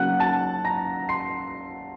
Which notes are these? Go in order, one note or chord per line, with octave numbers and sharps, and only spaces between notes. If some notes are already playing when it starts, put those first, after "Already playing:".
Already playing: C#3 F#3 A#3 C#4 F#5 F#6
A5 A6
A#5 A#6
C6 C7